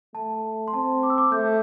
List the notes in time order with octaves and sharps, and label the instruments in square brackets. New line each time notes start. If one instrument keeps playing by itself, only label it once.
[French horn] A3 [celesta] A5
[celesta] C6
[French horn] C4 [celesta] A5
[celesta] D6
E6
D6
[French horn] A3 [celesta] G6